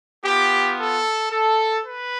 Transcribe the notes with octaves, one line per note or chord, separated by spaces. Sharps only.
B3 F4 G4
A4
A4
B4